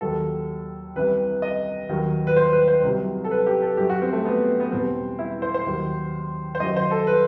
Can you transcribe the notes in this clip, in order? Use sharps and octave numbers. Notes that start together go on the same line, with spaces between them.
D#2 D#3 F#3 A4
C2 C3 E3 B4
D#5
D#2 D#3 F#3
B4
C5
B4
C5
C2 C3 F#3
A4
B4
G4
A4
F#2 F#3 G4
F#4
C4
A3
B3
B3
E2 B2 G3 C4
E4
C5
C5
D#2 D#3 F#3
C5
F#2 D#3 F#3 D#5
C5
A4
B4